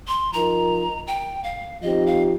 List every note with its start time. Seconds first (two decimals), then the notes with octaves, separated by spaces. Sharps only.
0.08 C6
0.33 F3 D#4 A#4 A#5
1.07 G5
1.44 F5
1.82 F3 C4 D#4 G4 D#5
2.07 F5